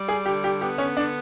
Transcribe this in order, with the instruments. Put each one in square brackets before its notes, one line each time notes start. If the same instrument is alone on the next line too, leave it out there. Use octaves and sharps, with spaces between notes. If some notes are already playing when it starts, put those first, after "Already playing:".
Already playing: [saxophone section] G3
[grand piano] G#4
[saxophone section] D3 [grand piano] G4
[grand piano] G4
[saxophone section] B3 [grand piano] G4
[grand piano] C#4
[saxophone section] D3 [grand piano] D4